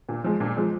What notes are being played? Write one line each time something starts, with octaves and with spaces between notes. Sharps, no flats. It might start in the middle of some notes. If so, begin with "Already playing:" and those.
A#2
F3 G#3
A#2
F3 G#3